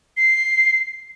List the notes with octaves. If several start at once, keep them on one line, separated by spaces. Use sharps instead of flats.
C7